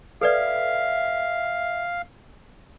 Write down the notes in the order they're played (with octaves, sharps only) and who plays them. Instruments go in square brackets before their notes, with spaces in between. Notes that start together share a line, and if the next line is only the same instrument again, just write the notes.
[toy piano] A4 B4 D5 [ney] E5 [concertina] F5